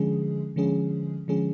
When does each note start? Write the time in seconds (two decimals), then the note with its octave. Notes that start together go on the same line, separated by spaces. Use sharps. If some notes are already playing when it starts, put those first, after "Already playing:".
Already playing: D3 F3 G#3 C#4 G#4
0.56 D3 F3 G#3 C#4 G#4
1.28 D3 F3 G#3 C#4 G#4